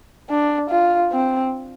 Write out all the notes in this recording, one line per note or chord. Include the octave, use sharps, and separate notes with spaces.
D4
F4
C4